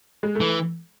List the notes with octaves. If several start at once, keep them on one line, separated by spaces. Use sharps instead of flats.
G#3
A3
E3